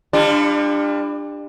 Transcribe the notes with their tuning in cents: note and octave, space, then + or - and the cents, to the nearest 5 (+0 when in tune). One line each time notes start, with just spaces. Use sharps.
G3 +35 D4 +10 F4 -20